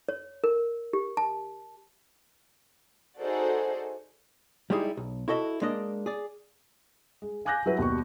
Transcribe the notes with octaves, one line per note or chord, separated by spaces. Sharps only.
C#5
A#4
G4
A5
D#4 F#4 G#4 A4 C5 D5
G3 G#3 D#4 E4 G4 G#4
B1
E4 F#4 A4 D#5 E5
G#3 A#3 D4 D#5
G#4 D5
G#3
F5 G#5 D6 F#6 G6 A#6
F#3 E4 F#4 G4 B4
D#2 B2 G3 C#6